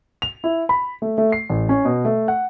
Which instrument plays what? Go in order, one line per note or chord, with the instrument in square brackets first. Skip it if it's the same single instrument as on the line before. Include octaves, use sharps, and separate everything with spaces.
[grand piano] F7
E4
B5
A3
A3
C7
A1
C#4
B2
A3
F#5